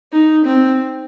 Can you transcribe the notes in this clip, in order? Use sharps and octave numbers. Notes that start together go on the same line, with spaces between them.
D#4
C4